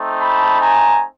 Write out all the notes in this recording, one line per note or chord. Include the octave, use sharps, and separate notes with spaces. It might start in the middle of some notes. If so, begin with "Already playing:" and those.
Already playing: A3 C4 D#4
A5 B5
G#5 A#5